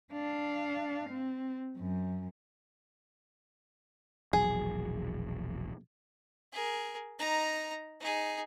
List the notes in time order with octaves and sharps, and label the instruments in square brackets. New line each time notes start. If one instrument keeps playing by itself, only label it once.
[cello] D4 F5
C4
F#2
[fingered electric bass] E1 A#1 F#3 [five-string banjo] G#4
[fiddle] G#4 A#4
D#4 A#5
D#4 G#4